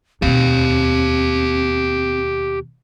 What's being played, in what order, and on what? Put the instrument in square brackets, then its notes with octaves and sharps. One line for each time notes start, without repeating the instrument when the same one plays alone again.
[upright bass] D#2 B2 [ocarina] C4 [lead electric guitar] G4 F5